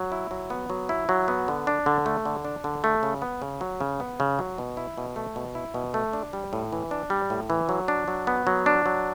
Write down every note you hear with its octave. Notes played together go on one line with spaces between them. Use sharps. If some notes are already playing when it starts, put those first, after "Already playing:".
Already playing: F#3
E4
F#3
B3
F#3
E4
F#3
B3
D3
D4
D3
A3
D3
D4
D3
A3
C#3
B3
C#3
F#3
C#3
B3
C#3
F#3
B2
E4
B2
A3
B2
E4
B2
A3
D4
G3
A2
E3
D4
G3
A2
E3
F#3
D4
F#3
B3
F#3
D4
F#3